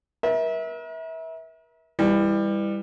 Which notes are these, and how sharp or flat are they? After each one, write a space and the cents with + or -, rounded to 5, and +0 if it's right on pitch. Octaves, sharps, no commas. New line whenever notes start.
A#4 +45 E5 -25
E3 +0 G3 +25